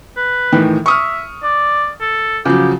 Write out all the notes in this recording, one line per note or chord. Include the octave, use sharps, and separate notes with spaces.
B4
A2 D#3 E3
E5 C#6 D#6 F6
D5
A4
C#3 F3 F#3 G4